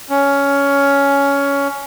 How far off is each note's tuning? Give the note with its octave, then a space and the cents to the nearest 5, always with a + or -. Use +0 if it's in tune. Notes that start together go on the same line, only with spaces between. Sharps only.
C#4 +15